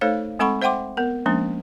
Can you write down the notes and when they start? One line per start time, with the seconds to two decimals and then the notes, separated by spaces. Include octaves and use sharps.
0.01 A3 D#4 A4 C5 C#5 F5
0.39 G#3 C4 A4 F#5 B5 C#6
0.62 C5 E5 F#5 G5 C6 D6
0.97 B3 A#4
1.26 F3 G#3 A#3 C#4 D4